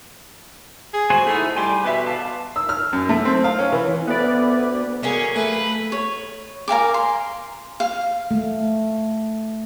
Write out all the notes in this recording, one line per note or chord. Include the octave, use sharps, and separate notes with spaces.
G#4
F#4 C5 G#5
A3 D#4 E4 G#4
G3 G#5 C6 D6
B2 B4 E5
F5 A5 D6
E6
F6
F#2
A3
C4
F5
C#4
E3
D2 B3 B4 D5
F#3 A#3 C#4 G#4
A3 B4
C#5
A#4 F5 G#5 D6
C6
F5
A3